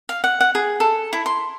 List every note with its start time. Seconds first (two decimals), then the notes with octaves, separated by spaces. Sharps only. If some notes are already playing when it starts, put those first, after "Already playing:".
0.09 F5
0.24 F#5
0.41 F#5
0.55 G#4
0.80 A4
1.13 E4
1.26 C6